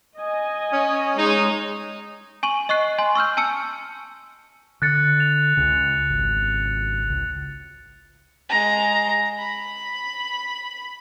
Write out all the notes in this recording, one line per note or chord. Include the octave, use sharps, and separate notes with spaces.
D#5 G#5
C#4
G#3 D#4 C#5
G#5 C#6 D#7 F#7
D#5 C#6 F#6 C7
G#5 C6
C#6 E6 F6 G6
G#5 A5 E6 C#7
D3 F#6 A6 C#7
F7
C#2 C#3
G#1 C#2
C#2
G#3 A#5
B5